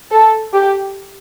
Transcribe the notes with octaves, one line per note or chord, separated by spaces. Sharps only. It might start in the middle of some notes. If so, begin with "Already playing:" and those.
A4
G4